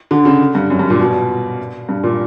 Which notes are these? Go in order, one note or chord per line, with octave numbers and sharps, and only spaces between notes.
D3
C#3
G2
F#2
G2
A#2
B2
G2
A#2